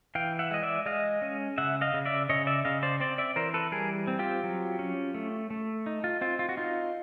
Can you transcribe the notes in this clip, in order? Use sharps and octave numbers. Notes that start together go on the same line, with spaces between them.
E3 F5 G5
E5 F#5
G#3 D#5
D5 E5
G#3 D#5 F5
C#4
C#3 E5 F#5
D#5 F5
C#3
D5 E5
C#3 C#5 D#5
D5 E5
C#3 D#5 F5
C5 D5
C4 C5 D5
D5 E5
E3 A#4 C5
A4 B4
G3 G#4 A#4
C4
F4 G4
F#3
C#4
A3
A3
D#4
F4
C4 F4
F4
F#4
D#4 F4